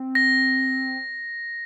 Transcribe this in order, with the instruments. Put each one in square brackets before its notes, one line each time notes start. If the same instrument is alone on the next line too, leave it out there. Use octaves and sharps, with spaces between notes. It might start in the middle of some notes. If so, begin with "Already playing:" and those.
Already playing: [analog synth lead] C4
[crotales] A#6